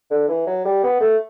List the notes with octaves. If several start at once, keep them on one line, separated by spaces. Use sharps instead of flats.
D3
E3
F#3
G3
B3
A3